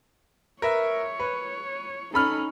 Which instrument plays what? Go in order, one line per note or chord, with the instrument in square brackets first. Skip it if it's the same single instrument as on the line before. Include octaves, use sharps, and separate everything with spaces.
[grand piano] A#4 B4 E5 [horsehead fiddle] C#5
[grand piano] B4
[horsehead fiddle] C#4 D#4 [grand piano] A4 B5 F6